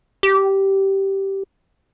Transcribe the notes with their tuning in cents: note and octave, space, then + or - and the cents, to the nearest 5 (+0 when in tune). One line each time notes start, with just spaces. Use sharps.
G4 -10